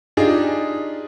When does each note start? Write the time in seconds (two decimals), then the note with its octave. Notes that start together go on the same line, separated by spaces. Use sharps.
0.17 D4 D#4 F4 G4 G#4